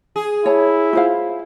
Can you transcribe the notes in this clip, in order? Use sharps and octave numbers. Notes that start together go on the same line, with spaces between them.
G#4
E4 C#5 A5
F4 C5 F5